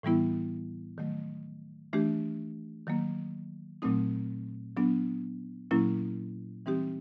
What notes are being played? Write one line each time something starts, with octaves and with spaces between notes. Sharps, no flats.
A2 E3 G3 B3 E4
D#3 F#3 A3
E3 A3 D4 G4
D#3 F#3 A#3
A#2 F#3 A3 C4 D#4
F#3 B3 D4
A#2 F#3 A#3 C#4 E4
E3 G3 C4 D#4 G4